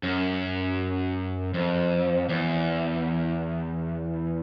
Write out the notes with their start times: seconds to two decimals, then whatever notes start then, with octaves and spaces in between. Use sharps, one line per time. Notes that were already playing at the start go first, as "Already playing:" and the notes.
0.03 F#2
1.54 F2
2.29 E2